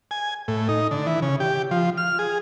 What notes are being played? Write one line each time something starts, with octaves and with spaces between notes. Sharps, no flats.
G#5
A2
D#4
D3
E3
C#3
G4
F3
F6
G#4